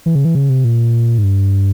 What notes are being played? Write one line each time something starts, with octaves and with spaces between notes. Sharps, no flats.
E3
C#3
E3
C#3
C3
A#2
G#2
G2